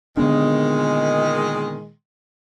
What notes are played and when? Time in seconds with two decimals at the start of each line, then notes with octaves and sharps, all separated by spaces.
0.17 A#2 D3 D#3 G#3 B3 D4